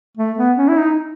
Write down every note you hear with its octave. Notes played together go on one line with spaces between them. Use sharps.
A3
B3
C#4
E4
D#4